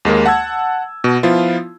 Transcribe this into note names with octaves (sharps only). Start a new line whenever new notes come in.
D#2 G#3 A#3 A#4
F#5 A5 E6 G#6
B2
F3 B3 E4 F4